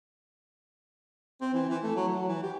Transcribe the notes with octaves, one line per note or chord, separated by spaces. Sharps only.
C4
E3
E3
A3
F#3
F#3
E3
G4